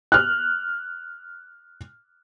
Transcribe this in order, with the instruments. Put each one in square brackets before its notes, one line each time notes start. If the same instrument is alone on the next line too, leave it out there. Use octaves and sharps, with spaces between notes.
[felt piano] F6 F#6